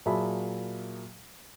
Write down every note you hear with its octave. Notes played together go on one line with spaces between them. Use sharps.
A#2 F#3 G#4 E5 A5 B5